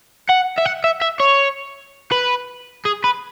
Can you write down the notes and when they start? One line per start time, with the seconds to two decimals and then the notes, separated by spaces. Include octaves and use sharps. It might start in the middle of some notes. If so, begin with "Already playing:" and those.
0.29 F#5
0.58 E5
0.65 F#5
0.84 E5
1.02 E5
1.20 C#5
2.12 B4
2.85 G#4
3.04 B4